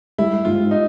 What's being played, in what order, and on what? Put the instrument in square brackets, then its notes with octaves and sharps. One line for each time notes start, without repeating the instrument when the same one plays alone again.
[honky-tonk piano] G3 [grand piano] E4
[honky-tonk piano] G#2 [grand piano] F4
[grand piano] D#4